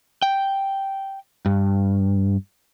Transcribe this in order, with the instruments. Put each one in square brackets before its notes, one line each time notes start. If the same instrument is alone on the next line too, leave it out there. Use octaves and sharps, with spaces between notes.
[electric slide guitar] G5
G2